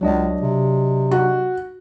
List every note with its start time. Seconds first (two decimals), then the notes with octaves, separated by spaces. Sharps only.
0.01 C#2 F#3 D4 D#5
0.41 C3
1.11 F#4